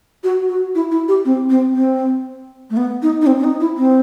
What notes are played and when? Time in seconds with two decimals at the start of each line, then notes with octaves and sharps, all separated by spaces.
0.24 F#4
0.49 F#4
0.75 E4
0.91 E4
1.08 G4
1.25 C4
1.50 C4
1.75 C4
2.70 A3
2.77 B3
3.02 D#4
3.21 D#4
3.26 C4
3.39 C4
3.44 D#4
3.60 E4
3.77 C4